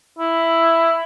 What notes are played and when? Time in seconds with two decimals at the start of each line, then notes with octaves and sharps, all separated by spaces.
0.19 E4